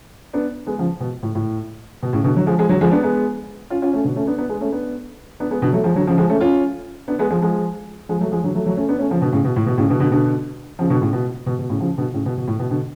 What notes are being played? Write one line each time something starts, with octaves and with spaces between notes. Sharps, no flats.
B3 D4
G#3 B3
C#3 F3
B2
A2
A2
B2
A2 C#3
B2 D3
D3 F#3
F3 G#3
F3 G#3
D3 F#3
F3 G#3
B3 D4
G#3 B3
C#4 F4
C#4 F4
A3 C#4
B2 D3
A3 C#4
B3 D4
B3 D4
G#3 B3
A3 C#4
B3 D4
B3 D4
G#3 B3
B2 D3
F#3 A3
F3 G#3
D3 F#3
C#3 F3
F3 G#3
A3 C#4
C#4 F4
B3 D4
G#3 B3
F3 G#3
F3 G#3
F3 G#3
F#3 A3
F3 G#3
D3 F#3
F#3 A3
F#3 A3
A3 C#4
B3 D4
A3 C#4
C#3 F3
B2 D3
A2 C#3
B2
A2
B2
A2 C#3
B2 D3
B2 D3
B2 D3
C#3 F3
B2 D3
A2 C#3
B2
B2
B2
A2 C#3
C#3 F3
B2 D3
A2 C#3
B2
B2
A2
B2
B2 D3